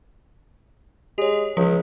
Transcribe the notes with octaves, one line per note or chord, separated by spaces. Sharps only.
G#3 G4 C#5
C#2 F3